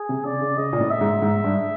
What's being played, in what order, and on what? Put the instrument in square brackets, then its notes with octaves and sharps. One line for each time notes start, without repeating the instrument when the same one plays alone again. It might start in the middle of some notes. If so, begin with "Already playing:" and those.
Already playing: [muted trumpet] G#4
[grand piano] C3
[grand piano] C#3 [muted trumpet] D5
[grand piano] C#3
[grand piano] C#3 [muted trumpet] D#5
[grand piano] A#2
A2
[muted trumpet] E5
[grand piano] G#2
G#2
G2